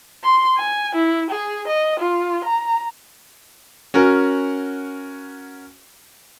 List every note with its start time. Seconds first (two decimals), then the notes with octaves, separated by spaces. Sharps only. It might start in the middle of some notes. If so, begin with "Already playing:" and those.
0.24 C6
0.58 G#5
0.96 E4
1.31 G#4
1.68 D#5
2.00 F4
2.45 A#5
3.94 C#4 F#4 A#4